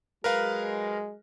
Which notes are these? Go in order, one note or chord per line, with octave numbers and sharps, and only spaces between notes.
F#3 G#3 A#4 B4 F5